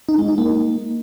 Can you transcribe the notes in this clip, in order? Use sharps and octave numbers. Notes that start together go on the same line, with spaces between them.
D#4
G#3
D#4
A#3